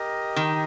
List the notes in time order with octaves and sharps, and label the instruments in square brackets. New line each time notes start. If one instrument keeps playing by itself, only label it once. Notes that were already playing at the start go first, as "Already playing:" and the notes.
Already playing: [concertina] G4 A#4 D#5
[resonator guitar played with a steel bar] D#3